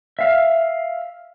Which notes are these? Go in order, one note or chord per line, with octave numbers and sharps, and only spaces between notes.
E5 F5